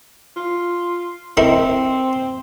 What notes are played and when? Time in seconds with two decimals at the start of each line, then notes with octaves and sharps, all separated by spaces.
0.36 F4
1.37 C4 D#4 E4 A#4